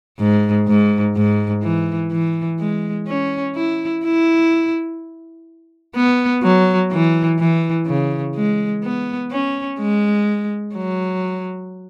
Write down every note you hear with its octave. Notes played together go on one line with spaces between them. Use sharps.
G#2
G#2
G#2
E3
E3
G#3
C#4
E4
E4
B3
F#3
E3
E3
C#3
G#3
B3
C#4
G#3
F#3